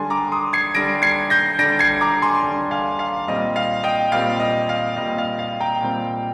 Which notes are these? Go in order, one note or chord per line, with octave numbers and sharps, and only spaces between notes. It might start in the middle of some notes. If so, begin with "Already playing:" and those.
Already playing: D3 G3 D4 G#5 C6
A#5 D6
C6 D#6
G#6 C7
D3 G3 D4 A#6 D7
G#6 C7
G6 A#6
D3 G3 D4 A#6 D7
G#6 C7
A#5 D6
G#5 C6
D3 G3 D4
F5 G#5
F5
A#2 G3 C4 D#5
F5
D#5 G5
A#2 G3 C4 F5
D#5
F5
A#2 G3 C4 D#5
F5
F5
G5 A#5
A#2 G3 C4